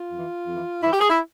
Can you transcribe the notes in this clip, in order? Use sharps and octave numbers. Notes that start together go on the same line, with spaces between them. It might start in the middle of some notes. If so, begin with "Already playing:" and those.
Already playing: F4
F2 E3
F2 E3
G2 E3 E4
G4
G#4
E4